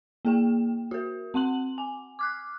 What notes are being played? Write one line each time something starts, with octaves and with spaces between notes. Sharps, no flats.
A#3 G#4 G5
F#4 A#4
C4 F#5 C6 F#7
G#5
D6 F6 F#6